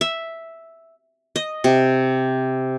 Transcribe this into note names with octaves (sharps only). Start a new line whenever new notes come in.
E5
D#5
C3